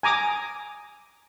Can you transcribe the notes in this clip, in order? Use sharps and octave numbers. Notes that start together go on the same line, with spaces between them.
G#5 A#5 D6 D#6